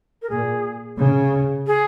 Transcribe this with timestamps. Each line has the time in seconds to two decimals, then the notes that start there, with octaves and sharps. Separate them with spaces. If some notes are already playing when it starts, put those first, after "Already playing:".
0.22 A#4
0.30 A#2 G#4
0.98 C#3
1.67 G#4